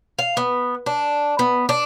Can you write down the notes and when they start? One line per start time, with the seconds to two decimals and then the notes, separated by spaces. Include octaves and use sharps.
0.19 F5
0.37 B3
0.86 D4
1.39 B3
1.69 D4